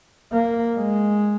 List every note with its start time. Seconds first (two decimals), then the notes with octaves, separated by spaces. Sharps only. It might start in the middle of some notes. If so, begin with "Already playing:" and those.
0.33 A#3
0.77 G#3